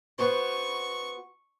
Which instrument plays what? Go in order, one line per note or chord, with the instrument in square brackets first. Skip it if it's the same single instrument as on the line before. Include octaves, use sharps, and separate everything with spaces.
[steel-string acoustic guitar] B3 F#4 C5 [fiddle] C#6